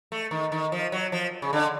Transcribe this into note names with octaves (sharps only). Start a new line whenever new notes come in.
A3
D#3
D#3
F3
F#3
F3
C#3
D3